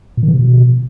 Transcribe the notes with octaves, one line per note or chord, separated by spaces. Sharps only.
A#2
D#3
E3
C3
B2